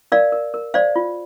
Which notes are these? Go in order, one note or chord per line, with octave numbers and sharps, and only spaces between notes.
A#4 D5 F5
A#4
A#4
C5 D5 F5
F4